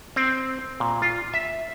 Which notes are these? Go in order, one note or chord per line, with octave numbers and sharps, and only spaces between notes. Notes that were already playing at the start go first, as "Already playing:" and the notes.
C4
A#2
F4
E5